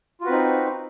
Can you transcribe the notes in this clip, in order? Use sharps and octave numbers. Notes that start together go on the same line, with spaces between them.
C4 D#4 F4 F#4 B4